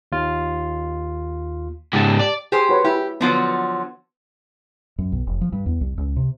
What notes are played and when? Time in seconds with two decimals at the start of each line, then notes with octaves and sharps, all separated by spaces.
0.12 D#2 F4
1.93 G#2 C#3 G4 A5
2.19 D5
2.52 G4 G#4 C5
2.69 F#4 B4 C#5
2.85 E4 G4
3.21 D3 F3 F#3 B3
4.98 F#2
5.12 B1
5.27 F1
5.41 F3
5.53 G2
5.66 E2
5.81 C2
5.97 C#2
6.16 C3